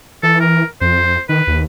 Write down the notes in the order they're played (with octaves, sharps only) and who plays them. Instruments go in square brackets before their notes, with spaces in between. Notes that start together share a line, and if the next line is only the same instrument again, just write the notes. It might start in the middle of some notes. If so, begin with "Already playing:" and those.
[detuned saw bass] E3 [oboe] A4
[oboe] A#4
[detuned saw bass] F2 [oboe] C5
[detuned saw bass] D#3 [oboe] B4
[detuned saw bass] D#2